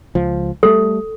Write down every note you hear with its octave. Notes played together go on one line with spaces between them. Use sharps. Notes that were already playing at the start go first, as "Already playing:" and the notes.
C#2 F3
G3 A3 A4